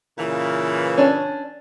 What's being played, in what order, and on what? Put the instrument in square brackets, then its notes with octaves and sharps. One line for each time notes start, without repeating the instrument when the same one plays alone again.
[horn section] A#2 C#3 E3
[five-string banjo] C#4 D4